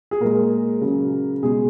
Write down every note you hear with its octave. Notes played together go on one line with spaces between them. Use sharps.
G#4
A#2 G#3 A#4
C#3 F#3
B2 G#3 G#4